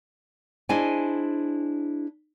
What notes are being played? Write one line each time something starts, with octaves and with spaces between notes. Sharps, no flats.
D4 E4 G#4 C5 D#5 G#5